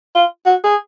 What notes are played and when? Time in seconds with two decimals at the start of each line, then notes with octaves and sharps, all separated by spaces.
0.15 F4
0.46 F#4
0.64 G#4